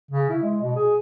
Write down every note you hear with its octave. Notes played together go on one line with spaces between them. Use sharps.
C#3
E4
G#3
B2
G#4